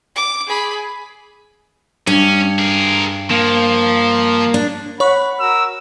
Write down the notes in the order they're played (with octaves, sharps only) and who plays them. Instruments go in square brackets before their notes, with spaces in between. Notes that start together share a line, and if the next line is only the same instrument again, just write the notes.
[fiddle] D6
G#4 B5
[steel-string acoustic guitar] G2 [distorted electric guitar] C#4
[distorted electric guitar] G#4 A#4
[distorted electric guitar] F3 [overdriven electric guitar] A#3
[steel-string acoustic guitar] D4
[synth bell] C#5 C#6 [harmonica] F#5 B5
[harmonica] F#4 A#4 [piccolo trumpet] E6